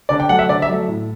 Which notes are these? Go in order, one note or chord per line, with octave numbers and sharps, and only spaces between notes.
D3 D5
G5
F#3 A3 F#5
E5
D3 D5
E5
F#3 A3
A2